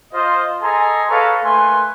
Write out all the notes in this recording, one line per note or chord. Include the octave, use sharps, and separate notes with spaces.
F4 C5 D#5
G#4 A4 D#5 G#5 A#5 C6
A4 B4 C#5 F5 A5 A#5
A3 A#3 B4 G#5 C6